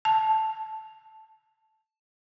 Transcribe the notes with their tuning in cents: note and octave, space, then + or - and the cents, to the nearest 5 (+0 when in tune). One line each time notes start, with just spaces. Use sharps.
A5 -5